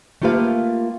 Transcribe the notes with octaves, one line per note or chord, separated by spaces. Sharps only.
A3 A#3 F4 G4 B4 F5